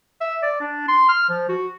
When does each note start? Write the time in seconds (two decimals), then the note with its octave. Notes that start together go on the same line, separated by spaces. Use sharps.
0.21 E5
0.43 D5
0.61 D4
0.88 C6
1.09 F6
1.29 F3
1.49 F#4